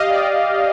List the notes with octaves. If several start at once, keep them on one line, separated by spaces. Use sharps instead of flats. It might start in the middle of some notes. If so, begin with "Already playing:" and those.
Already playing: G4 D#5 F5
D5